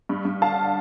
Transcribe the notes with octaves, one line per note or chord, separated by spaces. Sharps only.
G2
G2
D3 F5 A5